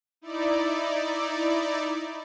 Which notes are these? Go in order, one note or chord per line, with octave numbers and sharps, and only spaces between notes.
D#4 E4 D5